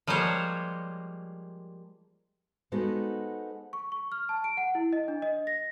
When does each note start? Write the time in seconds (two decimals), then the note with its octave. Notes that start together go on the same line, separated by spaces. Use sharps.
0.07 F3 G3 G#3 A#3 C5 C#5
2.72 G#3 B3 D#4 F#4 A4 C5
3.73 C#6
3.92 C#6
4.12 F6
4.29 A5
4.44 D7
4.57 F#5
4.75 E4
4.93 D#5
5.08 D4
5.22 D#5
5.47 A#6